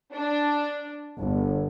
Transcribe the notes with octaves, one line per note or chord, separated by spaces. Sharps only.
D4
G1